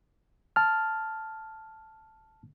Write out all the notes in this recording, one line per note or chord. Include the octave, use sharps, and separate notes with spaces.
A5 F6